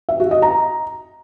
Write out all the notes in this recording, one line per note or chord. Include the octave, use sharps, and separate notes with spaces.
E5
F#4
D#5
A#5